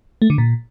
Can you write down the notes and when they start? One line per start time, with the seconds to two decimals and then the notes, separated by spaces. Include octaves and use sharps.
0.22 A3
0.30 D3
0.38 A#2